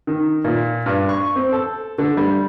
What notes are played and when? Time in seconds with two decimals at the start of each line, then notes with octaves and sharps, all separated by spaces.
0.07 D#3
0.44 A#2
0.86 G2
1.09 C#6
1.36 C4
1.52 A4
1.98 D3
2.17 G3